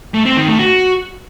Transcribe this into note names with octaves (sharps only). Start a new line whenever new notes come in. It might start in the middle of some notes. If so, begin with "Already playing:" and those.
A3
C4
D#3
A3
F#4